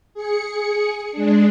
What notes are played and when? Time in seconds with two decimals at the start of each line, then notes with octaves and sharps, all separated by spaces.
0.14 G#4 C#7
1.12 G#3 D4